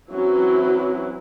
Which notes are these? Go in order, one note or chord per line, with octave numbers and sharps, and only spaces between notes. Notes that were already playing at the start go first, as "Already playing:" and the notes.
E3 F#3 C4 C#4 E4